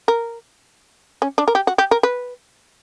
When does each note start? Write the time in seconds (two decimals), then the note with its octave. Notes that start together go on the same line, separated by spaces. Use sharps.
0.08 A#4
1.22 C#4
1.38 D4
1.48 A#4
1.55 G4
1.67 F#4
1.78 G4
1.91 A#4
2.03 B4